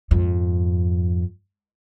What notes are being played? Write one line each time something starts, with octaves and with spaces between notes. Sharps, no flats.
F2 G#2